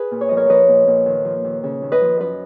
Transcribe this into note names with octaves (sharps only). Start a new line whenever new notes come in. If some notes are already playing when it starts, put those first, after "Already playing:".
Already playing: G#4 B4
A#2
C#5
F3 D#5
A#4 C#5
F3 B4 D#5
A#2
A#2
D#2
F3
D#2
C#3
D#2
B4 D#5
F3
F#2 B4 D#5